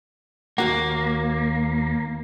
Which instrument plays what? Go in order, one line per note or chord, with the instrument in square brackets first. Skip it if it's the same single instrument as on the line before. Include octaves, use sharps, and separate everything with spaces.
[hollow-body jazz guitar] D#2 F#4 F#5 [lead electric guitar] A#3